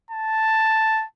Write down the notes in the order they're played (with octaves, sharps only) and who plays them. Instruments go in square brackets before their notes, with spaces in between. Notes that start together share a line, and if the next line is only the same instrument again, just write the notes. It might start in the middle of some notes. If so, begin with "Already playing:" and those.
[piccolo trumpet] A5